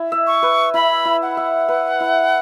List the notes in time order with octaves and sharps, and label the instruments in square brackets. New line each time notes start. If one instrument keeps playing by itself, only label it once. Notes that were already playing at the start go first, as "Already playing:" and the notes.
Already playing: [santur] E4
E5
[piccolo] C#6
[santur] B4
[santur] E4 [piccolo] B5
[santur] E4
[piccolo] F#5
[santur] E5
B4
E4